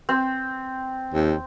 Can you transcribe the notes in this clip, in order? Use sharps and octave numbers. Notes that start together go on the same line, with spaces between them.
C4
D#2